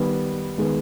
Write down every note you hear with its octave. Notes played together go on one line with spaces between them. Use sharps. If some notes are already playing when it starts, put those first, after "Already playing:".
Already playing: D#3 G3 B3
D#3 G#3 B3